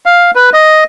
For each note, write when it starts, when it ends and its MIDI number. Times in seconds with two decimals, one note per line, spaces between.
0.06 0.31 77
0.35 0.50 71
0.53 0.84 75